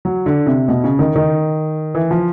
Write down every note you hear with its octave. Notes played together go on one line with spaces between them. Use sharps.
F#3
D3
C3
B2
C#3
D#3
D#3
E3
F3